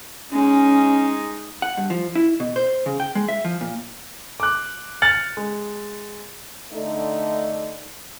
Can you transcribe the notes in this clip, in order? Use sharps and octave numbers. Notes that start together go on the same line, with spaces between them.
G#3 C#4 D#4
F#5
G2
F3
E4
B2
C5
C#3
G5
G#3
E5
F3
A#2
D6 F#6
F6 A6 C#7 F#7
G#3
D3 A3 D#4